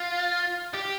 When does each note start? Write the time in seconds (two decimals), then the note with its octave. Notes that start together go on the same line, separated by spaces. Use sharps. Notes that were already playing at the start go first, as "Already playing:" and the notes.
Already playing: F4
0.74 G4